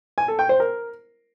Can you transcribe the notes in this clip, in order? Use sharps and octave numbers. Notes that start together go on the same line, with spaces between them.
G#5
A4
G5
C5
A#4